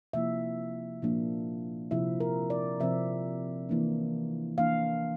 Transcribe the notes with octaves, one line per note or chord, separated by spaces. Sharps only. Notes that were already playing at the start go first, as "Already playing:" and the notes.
C3 F3 A#3 E4 E5
A#2 F3 A#3 D4
C3 F3 C4 E4 E5
A#4
D5
C3 F3 C4 E5
E3 A#3 D4
E3 A#3 D4 F5